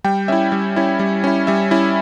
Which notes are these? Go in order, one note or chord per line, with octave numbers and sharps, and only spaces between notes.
G3 G5
C#4 E4 E5
G3
C#4 E4
G3
C#4 E4
G3 E5
C#4 E4